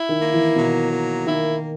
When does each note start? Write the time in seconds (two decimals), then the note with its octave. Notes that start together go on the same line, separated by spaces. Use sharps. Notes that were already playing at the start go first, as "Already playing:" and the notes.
Already playing: E4
0.09 D#3
0.21 A#3
0.34 E3
0.56 B2 F#3
0.92 A#3
1.26 D#3 E4